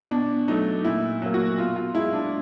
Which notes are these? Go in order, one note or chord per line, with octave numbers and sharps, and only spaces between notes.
B2 D4
F#3 A3 D#4
A#2 E4
F#3 A#3
F#4
B2 F4
F4
G#3 E4
D4